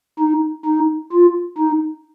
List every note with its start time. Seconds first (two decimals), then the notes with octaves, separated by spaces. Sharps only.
0.20 D#4
0.66 D#4
1.12 F4
1.58 D#4